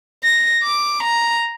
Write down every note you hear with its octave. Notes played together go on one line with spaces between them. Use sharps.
A#6
D6
A#5